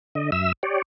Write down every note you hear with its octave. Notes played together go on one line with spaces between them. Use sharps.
D3 D#5
F#2 E5 E6
G4 C#5 D5